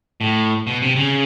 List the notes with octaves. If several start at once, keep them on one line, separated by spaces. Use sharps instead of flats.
A2
B2
C3
C#3